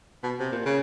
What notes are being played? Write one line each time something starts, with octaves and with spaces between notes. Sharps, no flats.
B2
C3
A#2
C#3